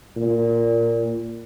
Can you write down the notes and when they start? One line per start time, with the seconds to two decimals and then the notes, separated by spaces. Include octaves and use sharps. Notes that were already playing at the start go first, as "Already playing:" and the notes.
0.17 A#2